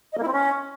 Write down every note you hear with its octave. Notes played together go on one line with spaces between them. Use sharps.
D#5
A#3
E4
C4
C#4